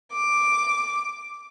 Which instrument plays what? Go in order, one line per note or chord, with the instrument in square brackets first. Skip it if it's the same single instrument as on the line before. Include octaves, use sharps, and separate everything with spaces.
[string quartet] D6